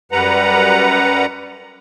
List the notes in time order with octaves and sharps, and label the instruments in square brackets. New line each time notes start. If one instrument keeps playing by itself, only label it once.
[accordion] F#2 G3 B4 F#5 A#5